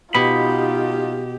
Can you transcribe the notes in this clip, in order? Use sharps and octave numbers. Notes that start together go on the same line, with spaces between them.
B2 D#4 F4 G4 B5